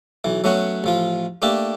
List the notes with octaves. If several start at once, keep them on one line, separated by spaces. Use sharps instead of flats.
B1 E3
F#3 A3 B3 C#4 F#4
A1 F3 F4
A3 A#3 D4 G4 A4